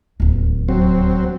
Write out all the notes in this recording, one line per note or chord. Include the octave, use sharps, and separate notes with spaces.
D1 D#2
F#3 C4